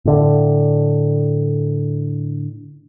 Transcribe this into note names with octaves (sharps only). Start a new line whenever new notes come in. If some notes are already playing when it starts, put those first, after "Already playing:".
A2 D3